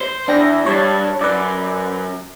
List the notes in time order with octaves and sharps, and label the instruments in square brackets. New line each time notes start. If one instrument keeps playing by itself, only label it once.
[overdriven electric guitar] C5
[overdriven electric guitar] E2 [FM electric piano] D4 G5 A#6
[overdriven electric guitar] G2 [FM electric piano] C#5 A5
[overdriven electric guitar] F#2 [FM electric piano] B4 D5